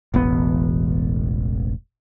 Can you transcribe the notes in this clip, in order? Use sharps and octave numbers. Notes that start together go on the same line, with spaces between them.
E1 A1 B3